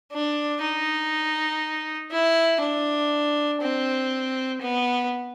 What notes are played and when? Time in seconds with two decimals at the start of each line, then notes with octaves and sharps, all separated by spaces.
0.12 D4
0.61 D#4
2.12 E4
2.61 D4
3.62 C4
4.61 B3